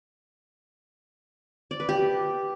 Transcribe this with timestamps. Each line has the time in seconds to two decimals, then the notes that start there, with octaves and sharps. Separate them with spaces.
1.71 D5
1.80 B4
1.89 G4